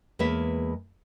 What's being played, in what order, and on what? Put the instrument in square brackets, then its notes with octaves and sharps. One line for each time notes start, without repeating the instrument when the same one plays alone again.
[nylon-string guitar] E2 G#3 A#3 B4 C#5 E5